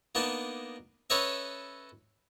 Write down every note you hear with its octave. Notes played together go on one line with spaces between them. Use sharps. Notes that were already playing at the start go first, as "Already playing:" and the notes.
A#3 B3 D4 D#4 A5
C#4 A4 B4 C#5 D#5 E5